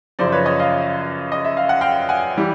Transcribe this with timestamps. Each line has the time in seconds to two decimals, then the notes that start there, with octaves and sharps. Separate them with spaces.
0.19 F#2 C#3 F3 C5 D5
0.32 B4 C#5
0.46 C#5 D#5
0.59 D#5 F5
1.32 D#5
1.45 E5
1.57 F5
1.69 F#5
1.81 F5 G5
2.09 F#5 G#5
2.37 E3 G3